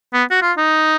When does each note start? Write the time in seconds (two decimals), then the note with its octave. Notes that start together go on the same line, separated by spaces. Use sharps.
0.13 B3
0.30 F#4
0.42 F4
0.57 D#4